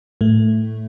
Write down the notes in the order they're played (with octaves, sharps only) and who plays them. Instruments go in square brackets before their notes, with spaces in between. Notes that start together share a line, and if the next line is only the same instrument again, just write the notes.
[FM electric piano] A2 A3